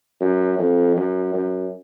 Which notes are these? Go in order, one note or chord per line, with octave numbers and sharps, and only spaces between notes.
F#2
F2
F#2
F#2